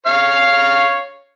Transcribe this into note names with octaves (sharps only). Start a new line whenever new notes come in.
C#5 F5 F6